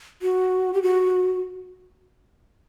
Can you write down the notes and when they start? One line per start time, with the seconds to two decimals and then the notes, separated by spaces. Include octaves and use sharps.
0.22 F#4
0.74 G4
0.82 F#4